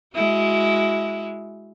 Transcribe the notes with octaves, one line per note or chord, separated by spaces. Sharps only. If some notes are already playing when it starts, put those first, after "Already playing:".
G#3 E4 F#4